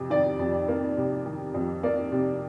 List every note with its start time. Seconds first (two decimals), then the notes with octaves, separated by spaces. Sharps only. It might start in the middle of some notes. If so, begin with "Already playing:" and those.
Already playing: F2 C3
0.10 D#3 D5
0.39 F2
0.68 A#3
0.97 C3
1.26 D#3
1.54 F2
1.83 A#3 D5
2.12 C3